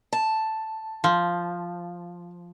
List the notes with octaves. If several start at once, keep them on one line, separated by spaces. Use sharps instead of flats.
A5
F3